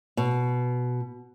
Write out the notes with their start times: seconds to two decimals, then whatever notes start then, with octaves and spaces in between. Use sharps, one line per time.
0.17 B2